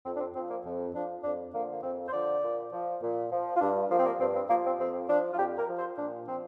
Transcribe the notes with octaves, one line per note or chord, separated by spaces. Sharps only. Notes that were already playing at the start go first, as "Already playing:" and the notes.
F2 C4
D4
C4
F3 C4
A#3
F2
F3 D4
F2 D4
D3 F3 A#3
A#3
F2 C4
C5
D3 F3 D5
A#2
F3
A#2
F3
F4
G2 D4
F3 A#3
C4
A#3
G2 C4
C4
F3 A#3
C4
F2 C4
F3 D4
F4
F2 G4
A#4
F3
C5
A#2 D4
F3 C4